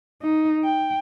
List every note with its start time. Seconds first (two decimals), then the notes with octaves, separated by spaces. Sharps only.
0.22 D#4
0.64 G5